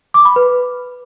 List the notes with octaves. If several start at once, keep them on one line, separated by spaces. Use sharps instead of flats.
D6
B5
B4